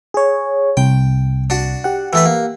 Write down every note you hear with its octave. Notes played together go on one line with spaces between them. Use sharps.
G#4 C#5
C2 G5
D4 F#4
G4 F#5
E3 A3 B4
A#3